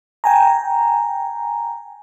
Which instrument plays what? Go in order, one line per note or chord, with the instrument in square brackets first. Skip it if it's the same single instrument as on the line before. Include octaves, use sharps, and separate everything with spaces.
[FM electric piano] G5 G#5 A#5